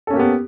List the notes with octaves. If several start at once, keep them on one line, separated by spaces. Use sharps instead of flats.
A#3 B3 C#4 G4 A4